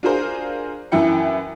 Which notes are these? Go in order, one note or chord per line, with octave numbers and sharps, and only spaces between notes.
D4 F4 F#4 G#4 A#4 C5
F#2 E3 E4 G5 C#7